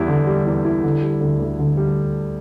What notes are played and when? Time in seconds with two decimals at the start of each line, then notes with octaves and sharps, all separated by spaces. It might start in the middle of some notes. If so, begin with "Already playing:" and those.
Already playing: E2 G3 E4
0.08 D3
0.27 G3
0.46 E2
0.65 E4
0.84 D3
1.02 G3
1.21 D2
1.39 D2
1.59 D3
1.77 G3